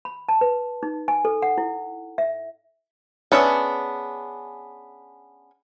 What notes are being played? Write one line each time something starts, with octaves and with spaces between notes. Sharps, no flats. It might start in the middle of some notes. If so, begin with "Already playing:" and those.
B5
A5
B4
D#4
G#5
A4
F#5
E4
E5
B3 C#4 D4 G#4 E5